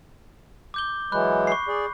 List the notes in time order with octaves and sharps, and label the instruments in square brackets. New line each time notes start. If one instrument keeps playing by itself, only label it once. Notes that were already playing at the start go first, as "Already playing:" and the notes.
[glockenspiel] D6 G6 G7
[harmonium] E3 F#3 G#3 [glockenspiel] B5 F#6
[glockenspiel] C#6 C7
[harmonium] G#4 D5